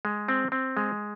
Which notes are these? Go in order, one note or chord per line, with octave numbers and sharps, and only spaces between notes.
G#3
C4
C4
G#3